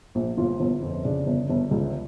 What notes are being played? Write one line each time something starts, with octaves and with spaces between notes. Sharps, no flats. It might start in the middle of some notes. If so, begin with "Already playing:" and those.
A#1
G1 F4
G1
F2
C#3 D4
G1
G1
C#2